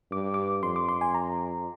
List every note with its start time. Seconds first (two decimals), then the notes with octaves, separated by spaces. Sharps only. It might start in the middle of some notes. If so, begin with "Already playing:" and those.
0.11 G2 D6
0.34 D6
0.63 F2 C6
0.76 D6
0.89 C6
1.01 G#5
1.14 A#5